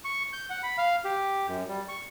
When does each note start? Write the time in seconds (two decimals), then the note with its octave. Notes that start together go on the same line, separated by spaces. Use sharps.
0.05 C#6
0.33 G6
0.50 F#5
0.63 B5
0.78 F5
1.05 G4
1.48 F#2
1.68 G3
1.88 C#6